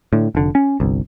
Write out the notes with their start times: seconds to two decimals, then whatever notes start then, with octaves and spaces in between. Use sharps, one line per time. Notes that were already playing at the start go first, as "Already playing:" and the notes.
0.13 A2 D3
0.35 F1 D3
0.55 C#4
0.80 G1 C2